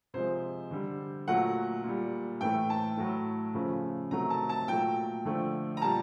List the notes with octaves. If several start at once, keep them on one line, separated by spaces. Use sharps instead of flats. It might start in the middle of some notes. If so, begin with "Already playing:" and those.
C3 F3 G#3 C5
D3 G3
A#2 F#3 A3 F#5
A#2 G3
A2 E3 A3 G5
A5
A2 F#3 A3
C#3 F3 A3
C3 D#3 F#3 A3 A#5
A5
A5
A#2 F#3 A3 G5
D3 F3 A3
A#5
A#2 G3 A5